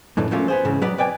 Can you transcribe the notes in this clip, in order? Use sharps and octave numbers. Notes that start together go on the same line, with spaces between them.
F#2 A2 D3 E3
F3 F#3 A3 A#3 C#4 F4
B3 G#4 C5
G#2 C#3 E3
F#3 B3 B4 D5 F#5
B4 D5 G5 G#5